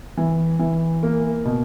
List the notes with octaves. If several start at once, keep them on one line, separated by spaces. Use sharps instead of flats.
E3
E3
A#3
B2